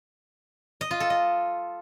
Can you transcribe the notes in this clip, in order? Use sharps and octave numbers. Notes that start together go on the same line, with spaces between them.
D#5
F4
A4
D#5